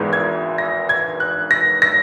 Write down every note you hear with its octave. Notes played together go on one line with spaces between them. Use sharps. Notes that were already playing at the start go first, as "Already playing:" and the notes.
Already playing: G#1 G#2 E3 G#3 B3
G#6
A#6
G#6
F#6
A#6
A#6